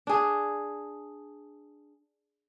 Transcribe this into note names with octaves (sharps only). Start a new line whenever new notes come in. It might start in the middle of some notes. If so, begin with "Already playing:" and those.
D4 G#4